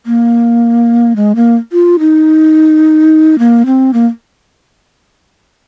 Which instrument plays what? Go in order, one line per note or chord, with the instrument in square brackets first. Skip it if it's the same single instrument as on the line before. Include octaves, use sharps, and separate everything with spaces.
[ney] A#3
G#3
A#3
F4
D#4
A#3
C4
A#3